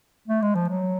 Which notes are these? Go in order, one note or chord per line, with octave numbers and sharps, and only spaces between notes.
A3
G#3
F3
F#3